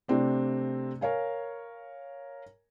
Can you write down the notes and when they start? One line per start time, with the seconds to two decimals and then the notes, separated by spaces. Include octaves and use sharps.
0.08 C3 A3 C4 D4
1.01 A#4 C#5 F5 G#5